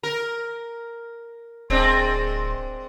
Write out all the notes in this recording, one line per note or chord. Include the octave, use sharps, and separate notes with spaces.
A#4
D1 G#3 C4 D4